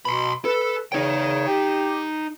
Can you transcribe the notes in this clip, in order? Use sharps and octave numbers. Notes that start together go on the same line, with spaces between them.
B2 B5 C6
A4 B4
E2 C#3 D#4 C#5 G5
G4